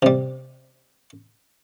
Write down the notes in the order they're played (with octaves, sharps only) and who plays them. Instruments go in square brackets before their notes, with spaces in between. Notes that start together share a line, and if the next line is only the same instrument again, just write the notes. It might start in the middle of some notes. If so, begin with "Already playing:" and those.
[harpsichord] C3 G3